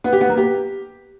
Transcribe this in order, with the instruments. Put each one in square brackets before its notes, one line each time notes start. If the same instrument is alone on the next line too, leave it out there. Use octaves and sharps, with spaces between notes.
[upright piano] B3
G4
B3
A#3
G4